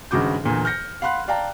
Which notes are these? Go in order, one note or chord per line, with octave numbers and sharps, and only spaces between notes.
G#1 G2 C#3 F#4 D6 G6
E2 A#2 D3
F6 G6 A#6 C#7
F5 F#5 B5 C6 F#6
D5 F5 G5 A5 A#5